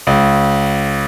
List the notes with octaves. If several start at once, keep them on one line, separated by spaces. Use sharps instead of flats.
C#2